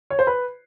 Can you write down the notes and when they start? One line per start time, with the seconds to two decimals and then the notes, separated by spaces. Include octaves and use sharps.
0.10 C#5
0.19 C5
0.27 B4